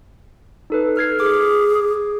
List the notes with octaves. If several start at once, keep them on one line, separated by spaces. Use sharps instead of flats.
D#4 A4 B4
A4 F6 G#6 C7
G#4 D6